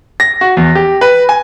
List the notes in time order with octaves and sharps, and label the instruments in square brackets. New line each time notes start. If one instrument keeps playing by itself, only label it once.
[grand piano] A#6
F#4
E2
G4
B4
G#5